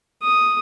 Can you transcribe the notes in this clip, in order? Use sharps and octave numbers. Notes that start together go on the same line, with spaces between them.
D#6